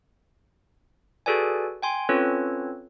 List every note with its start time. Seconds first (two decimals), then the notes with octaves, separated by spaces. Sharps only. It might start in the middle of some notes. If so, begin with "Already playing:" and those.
1.26 F#4 G#4 A4 B4 D5 G#5
1.82 G5 G#5 C6
2.09 C4 C#4 F4 A4 B4 C#5